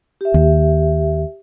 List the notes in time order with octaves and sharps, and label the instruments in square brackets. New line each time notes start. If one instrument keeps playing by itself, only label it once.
[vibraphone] G4 E5
[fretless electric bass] D#2